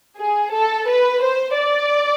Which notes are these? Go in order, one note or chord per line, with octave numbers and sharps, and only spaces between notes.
G#4
A4
B4
C5
D5